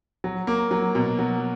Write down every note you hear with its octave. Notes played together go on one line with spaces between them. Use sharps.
F#3
A#3
F#3
B2
F#3